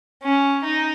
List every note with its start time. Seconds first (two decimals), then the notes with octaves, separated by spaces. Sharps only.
0.23 C#4
0.65 D#4